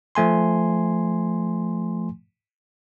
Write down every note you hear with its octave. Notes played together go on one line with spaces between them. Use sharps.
F3 A3 G#5 C6